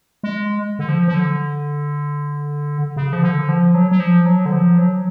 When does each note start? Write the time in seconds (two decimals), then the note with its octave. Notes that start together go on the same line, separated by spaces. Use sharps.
0.23 G#3
0.79 D3
0.89 F3
1.08 F3
1.14 D3
2.96 C#3
3.13 F3
3.23 D3
3.49 F3
3.74 F#3
3.91 F#3
4.00 F3
4.26 F#3
4.46 D3
4.53 F3
4.78 F#3